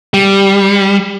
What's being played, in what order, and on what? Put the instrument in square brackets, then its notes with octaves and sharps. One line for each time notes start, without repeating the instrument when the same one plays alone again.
[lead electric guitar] G3